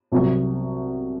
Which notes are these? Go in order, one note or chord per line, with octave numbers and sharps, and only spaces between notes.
C2 C3 F#3